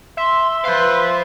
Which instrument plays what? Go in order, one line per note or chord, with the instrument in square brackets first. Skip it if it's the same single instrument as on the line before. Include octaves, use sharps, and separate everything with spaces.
[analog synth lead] E5 [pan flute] C6
[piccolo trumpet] B4 [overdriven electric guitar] C5 F5